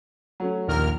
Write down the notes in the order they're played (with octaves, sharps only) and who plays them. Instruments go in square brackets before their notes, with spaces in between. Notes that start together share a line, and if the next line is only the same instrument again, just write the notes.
[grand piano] F#3 A3 C#4
[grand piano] A#1 [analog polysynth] D#2 A#4 F6